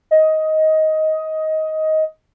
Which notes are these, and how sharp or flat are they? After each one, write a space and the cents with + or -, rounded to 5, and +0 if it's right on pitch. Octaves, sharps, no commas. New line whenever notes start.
D#5 +15